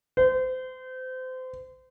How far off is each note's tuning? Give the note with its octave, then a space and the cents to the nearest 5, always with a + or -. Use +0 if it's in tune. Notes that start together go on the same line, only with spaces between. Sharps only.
C5 -30